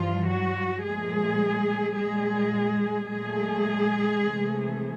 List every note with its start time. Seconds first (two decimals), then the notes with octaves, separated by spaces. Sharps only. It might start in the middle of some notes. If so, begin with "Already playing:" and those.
Already playing: G2 E3 F3 G3 F4
0.27 F#3 F#4
0.83 A#2 F3 G#3 A3 G#4
1.96 A#2 G3 G#3 G#4
3.09 A#2 F#3 G#3 A3 G#4
4.23 C3 E3 A3